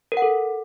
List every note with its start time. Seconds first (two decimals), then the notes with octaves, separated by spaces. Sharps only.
0.12 A#4
0.17 F#5
0.22 A4